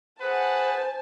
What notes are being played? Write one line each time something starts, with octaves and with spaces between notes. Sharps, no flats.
G#4 B4 C5 F#5 G#5 A5